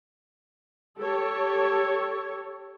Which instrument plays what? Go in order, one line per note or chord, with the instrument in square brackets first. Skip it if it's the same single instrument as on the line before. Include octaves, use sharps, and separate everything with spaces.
[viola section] G4 A4 C#5